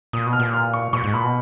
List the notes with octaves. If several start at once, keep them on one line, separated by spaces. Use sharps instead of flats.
A#2 D#6
B2
F6
A#2
F6
C#6
A#2 C#6
G#2
A#2 B5
B2